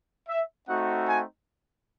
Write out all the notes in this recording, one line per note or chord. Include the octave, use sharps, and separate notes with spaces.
E5
A3 C4 D#4 F#4 F#5
G#5